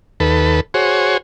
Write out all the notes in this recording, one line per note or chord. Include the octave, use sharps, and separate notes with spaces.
D#2 A4 B4
F#4 G#4 C5 C#5